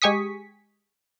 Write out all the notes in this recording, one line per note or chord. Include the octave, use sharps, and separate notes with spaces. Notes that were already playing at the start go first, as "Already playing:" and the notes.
G#3 G4 G#5 C#6 D#6 B6